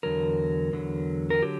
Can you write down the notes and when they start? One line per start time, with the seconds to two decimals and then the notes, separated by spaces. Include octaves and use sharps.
0.03 E2 D3 F#3 A#4
0.73 E2 D3 F#3
1.30 A#4
1.42 D3 F#3 G4